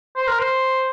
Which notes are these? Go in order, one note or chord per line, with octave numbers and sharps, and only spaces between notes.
C5
A#4
C5